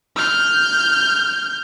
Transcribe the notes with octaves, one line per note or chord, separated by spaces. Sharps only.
F6 G6